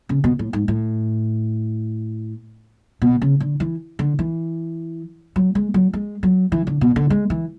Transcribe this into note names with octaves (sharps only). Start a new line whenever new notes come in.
C#3
B2
A2
G#2
A2
B2
C#3
D3
E3
D3
E3
F#3
G#3
F#3
G#3
F#3
E3
D3
B2
D3
G#3
E3